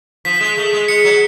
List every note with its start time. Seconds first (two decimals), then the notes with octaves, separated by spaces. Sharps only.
0.25 F3 B6
0.41 G#3
0.57 A3
0.73 G#3
0.88 G#3 C#7
1.04 F#3